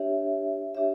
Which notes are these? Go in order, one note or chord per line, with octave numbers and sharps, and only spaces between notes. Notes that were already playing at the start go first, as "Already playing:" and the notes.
Already playing: D4 G4 C#5 E5
D4 G4 C#5 E5